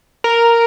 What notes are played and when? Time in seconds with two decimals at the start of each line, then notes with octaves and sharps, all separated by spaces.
0.24 A#4